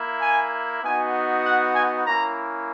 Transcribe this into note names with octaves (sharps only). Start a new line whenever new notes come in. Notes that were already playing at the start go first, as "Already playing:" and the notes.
Already playing: A#3 E4
G#5
B3 D#4 F#4 G#5
F#5
G#5
A#3 C#4 E4 A#5